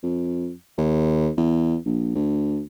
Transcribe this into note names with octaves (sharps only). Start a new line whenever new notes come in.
F2
D#2
E2
A#1
D2